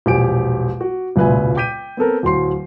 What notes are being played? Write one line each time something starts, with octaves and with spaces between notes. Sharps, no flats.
E1 A#1 G4 G#5 D7
F#4
E1 C#2 A#2 B4 E5 G#5
G5 D6 G6 B6 D#7
B3 C4 A4 A#4
D1 F#3 C6 C7